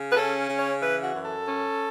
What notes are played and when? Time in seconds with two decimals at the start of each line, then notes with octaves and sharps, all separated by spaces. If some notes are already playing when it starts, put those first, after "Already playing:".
Already playing: C#3
0.11 B4
0.17 C#4 A4
0.49 C#3
0.59 C#5
0.81 E3 B4
1.03 F#4
1.14 F#2
1.24 A4
1.47 C#4